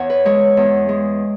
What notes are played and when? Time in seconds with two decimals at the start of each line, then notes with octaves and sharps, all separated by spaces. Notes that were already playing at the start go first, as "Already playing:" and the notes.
Already playing: E2 C#5 F#5
0.10 B4
0.25 G#3 C#5
0.57 E2
0.89 G#3